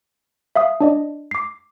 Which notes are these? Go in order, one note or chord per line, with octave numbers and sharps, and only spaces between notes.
E5 F5 D#6
D4 D5 D#5
D6 C7